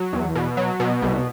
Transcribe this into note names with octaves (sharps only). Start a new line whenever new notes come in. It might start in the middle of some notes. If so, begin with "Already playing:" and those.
Already playing: F#3
E2
B2
F#3
B2
C2